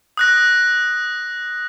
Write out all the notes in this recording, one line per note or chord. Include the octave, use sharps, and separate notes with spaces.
D#6 F#6 A#6